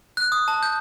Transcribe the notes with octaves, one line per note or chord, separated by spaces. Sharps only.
F#6
D#6
A5
G6